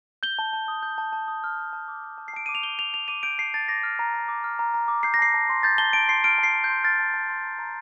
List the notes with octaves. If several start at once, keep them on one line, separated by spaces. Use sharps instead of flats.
G6 G7
A5
A5
D#6
G6
A5
A5
D#6
F6
A5
A5
D6
F6
A5
C7
A5 D7
D6 D#7
F7
G6 G7
A5 F7
A5 F7
D6 D#7
G6 D7
A5 C7
A5 A6
D6 A#6
F6
A#5
A#5
D6
F6
A#5
A#5
D6
G6 C7
A#6
A5 C7
A5
C6
G6 A6
A5 G7
A5 D7
C6 C7
F6 D7
A5 C7
A5
G6
C6
F6 A6
A5
A5
C6
A#5
A#5